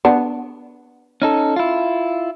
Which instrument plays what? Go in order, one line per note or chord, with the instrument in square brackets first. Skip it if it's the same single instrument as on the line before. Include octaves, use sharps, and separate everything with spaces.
[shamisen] B3 D4
[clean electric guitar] C#4 D#4 A4
E4 F4